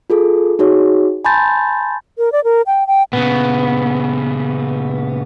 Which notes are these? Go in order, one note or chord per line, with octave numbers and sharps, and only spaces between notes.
F4 G#4 A4
D#4 F#4 G#4 C#5
G#5 A5 B5 C6 G6 A6
A#4
D5
A#4
G5
G5
A#2 C#3 B3